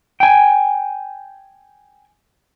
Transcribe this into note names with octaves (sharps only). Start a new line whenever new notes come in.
G5 G#5